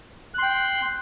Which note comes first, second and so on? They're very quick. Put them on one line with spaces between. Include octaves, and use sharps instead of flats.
F#6 C6 G5